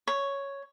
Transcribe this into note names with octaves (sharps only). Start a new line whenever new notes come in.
C#5